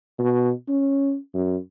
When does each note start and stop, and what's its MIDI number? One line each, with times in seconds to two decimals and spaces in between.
0.19 0.51 47
0.68 1.16 61
1.34 1.57 42